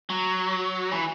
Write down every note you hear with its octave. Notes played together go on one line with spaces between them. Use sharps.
F#3
E3